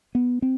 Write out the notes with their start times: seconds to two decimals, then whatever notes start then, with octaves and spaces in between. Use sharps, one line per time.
0.15 B3
0.42 C4